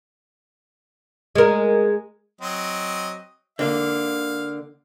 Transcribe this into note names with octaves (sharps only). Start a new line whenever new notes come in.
G#3 A#4
F#3 C4 D#5
D3 A#3 F5